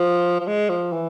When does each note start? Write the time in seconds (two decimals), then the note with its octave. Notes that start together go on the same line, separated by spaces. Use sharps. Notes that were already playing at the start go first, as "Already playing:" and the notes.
Already playing: F3
0.40 F3
0.47 G#3
0.70 F3
0.92 E3